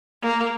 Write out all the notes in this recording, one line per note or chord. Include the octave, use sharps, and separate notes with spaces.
A#3